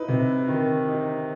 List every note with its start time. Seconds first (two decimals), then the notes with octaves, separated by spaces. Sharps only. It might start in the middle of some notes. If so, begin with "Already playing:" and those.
Already playing: D#4 E4 B4
0.08 C3
0.48 D#3
0.88 D#4